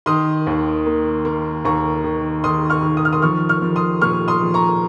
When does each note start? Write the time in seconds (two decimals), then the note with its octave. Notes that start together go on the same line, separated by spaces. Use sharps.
0.06 D#3 C6 D#6
0.47 D#2
0.86 A#3
1.25 A#3
1.65 D#2 A#5 C#6
2.04 D#3
2.44 D#3 C6 D#6
2.70 C#6 F6
2.83 D#3
2.97 D#6
3.05 F6
3.13 C6 D#6
3.22 F3 C#6 F6
3.49 C#6 F6
3.62 F3
3.76 C6 D#6
4.01 A#2 C#6 F6
4.28 C6 D#6
4.41 F3
4.54 A#5 C#6